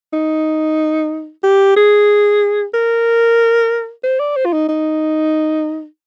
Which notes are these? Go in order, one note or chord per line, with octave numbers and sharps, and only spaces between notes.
D#4
G4
G#4
A#4
C5
D5
C5
F4
D#4
D#4